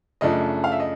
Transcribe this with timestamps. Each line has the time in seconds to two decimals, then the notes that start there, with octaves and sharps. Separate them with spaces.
0.21 F#2 C#3 F3 A3 D4 D#5
0.64 F5
0.72 E5
0.80 D#5